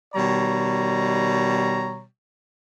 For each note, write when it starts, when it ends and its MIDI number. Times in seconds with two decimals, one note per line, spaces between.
0.14 2.02 47
0.14 2.02 51
0.14 2.02 55
0.14 2.02 73
0.14 2.02 82